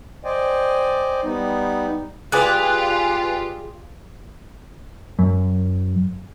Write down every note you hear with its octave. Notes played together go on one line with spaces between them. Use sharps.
C5 D5 D#5 G5 G#5
G3 B3 D#4
G#3 F4 G4 B4 D5 G#5 F#6
F#2